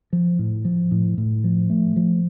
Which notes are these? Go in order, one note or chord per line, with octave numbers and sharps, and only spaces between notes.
F3
A2
F3
A2
A2
F3
A3
F3